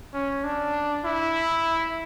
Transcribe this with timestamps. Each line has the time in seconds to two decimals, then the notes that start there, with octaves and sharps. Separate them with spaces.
0.13 C#4
0.44 D4
1.05 E4